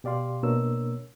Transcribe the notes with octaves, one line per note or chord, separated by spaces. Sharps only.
B2 G4 D5 F5 C6
B2 A#3 D4 A#4 C#5 E6